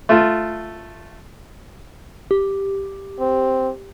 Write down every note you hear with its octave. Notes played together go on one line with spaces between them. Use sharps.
A3 F4
G4
C4